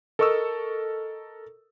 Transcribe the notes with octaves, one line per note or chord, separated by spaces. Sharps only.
A4 A#4 D#5 C#6 D#6 E6